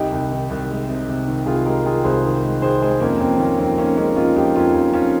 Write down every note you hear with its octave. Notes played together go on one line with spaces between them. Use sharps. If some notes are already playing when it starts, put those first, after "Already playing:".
Already playing: C2 D#4 G4
C2
D#3
C2
G#3
C3
C3
D#3
C2 F4 G#4
G#3 G4 A#4
D#3 F4 G#4
C2 G#4 C5
D#3
G#3
D#3 G#4 C5
G#3 G#4 C5
F2 A#3 C#4
F2 C4
D#3 A#3 C#4
F2 C4
D#3 A#3 C#4
G#3 A#3 C#4
G#3 C#4 F4
F2 D#4 G4
F2 C#4 F4
F2
F2 C#4 F4